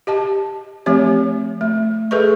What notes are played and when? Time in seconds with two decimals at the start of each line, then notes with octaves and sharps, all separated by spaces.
0.07 G4 D#5 A5
0.86 F3 A3 C4 G4 C#5
1.61 A3
2.11 A3 G#4 A4 B4 D#5 C#6